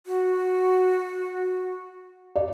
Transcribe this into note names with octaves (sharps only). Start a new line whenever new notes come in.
F#4
D5